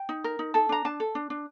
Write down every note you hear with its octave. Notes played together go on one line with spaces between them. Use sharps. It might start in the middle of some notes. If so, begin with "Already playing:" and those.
Already playing: G5
D#4
A#4
D#4
A4 A5
D4 A#5
D4 A5
A4
D4
D4